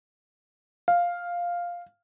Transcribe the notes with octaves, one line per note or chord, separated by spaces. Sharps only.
F5